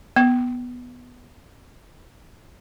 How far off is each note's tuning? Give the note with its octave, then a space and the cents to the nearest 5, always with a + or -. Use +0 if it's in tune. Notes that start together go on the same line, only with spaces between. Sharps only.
B3 -5